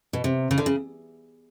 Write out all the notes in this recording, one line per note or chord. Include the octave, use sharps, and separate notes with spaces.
B2
C3
C#3
D3
C#3